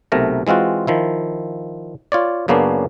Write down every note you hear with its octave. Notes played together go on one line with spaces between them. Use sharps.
B1 C3 A3 A#4 A#5
E3 G#3 C4 F4 F#4
D#3 F3 E4
F4 C#5 D5
F#2 C#3 A#3 B3 C#4 D4